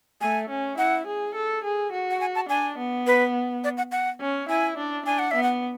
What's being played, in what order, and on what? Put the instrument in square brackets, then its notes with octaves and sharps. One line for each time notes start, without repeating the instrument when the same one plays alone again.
[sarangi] A3 [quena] G#5
[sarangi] C#4
[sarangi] E4 [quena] F#5
[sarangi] G#4
A4
G#4
F#4
[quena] F#5
G#5
A5
[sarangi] D4 [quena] G#5
[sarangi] B3
[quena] B4
D5
F#5
F#5
[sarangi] C#4
[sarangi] E4 [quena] G#5
[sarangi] D4
[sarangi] D4 [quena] G#5
[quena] F#5
[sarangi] B3 [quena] E5
[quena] F#5